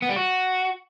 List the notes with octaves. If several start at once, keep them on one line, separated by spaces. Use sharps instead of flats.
B3
G3
F#4